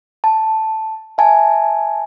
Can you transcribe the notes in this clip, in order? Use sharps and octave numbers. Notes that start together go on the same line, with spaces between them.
A5
E5 G#5 A5